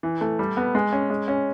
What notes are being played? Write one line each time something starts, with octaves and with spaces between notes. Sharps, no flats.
E3
A3
G3
B3
G#3
C#4
G#3
C#4